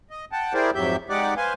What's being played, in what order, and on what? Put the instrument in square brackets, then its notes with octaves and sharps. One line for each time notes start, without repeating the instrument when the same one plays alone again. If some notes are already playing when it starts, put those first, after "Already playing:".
[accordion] D#5
F#5 G5 A5
E4 G4 G#4 A#4 C5 D5
F2 G#2 F#3 G4 E5 G6
G#3 D#4 G4 D5 F#5 D6
B4 C5 F5 G#5 C6